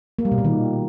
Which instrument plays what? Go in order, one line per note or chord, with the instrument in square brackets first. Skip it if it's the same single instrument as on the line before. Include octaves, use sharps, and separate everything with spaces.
[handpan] A#3
G3
B2
A#2
D#3